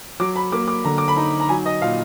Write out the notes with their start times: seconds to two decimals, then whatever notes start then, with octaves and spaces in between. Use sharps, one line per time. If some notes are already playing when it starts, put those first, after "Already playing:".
0.20 F#3 D6
0.36 B5
0.52 A#3 D6
0.68 D6
0.84 D3 A#5
0.98 D6
1.08 B5
1.16 D#4 A#5
1.40 A#5
1.49 F#3 G#5
1.66 D#5
1.82 A#2 F5